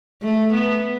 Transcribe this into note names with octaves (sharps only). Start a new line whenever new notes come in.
A3
B3